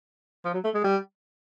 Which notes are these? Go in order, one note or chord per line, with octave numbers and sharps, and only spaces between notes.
F3
F#3
A3
G#3
G3